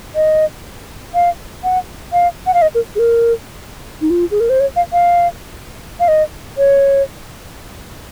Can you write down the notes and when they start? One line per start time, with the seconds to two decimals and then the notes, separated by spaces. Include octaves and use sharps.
0.15 D#5
1.14 F5
1.64 F#5
2.13 F5
2.47 F#5
2.54 F5
2.62 D#5
2.75 A#4
2.96 G#4
2.99 A#4
4.01 D#4
4.10 F4
4.31 G#4
4.40 A#4
4.50 C5
4.60 C#5
4.76 F5
4.93 F5
6.00 F5
6.08 D#5
6.58 C#5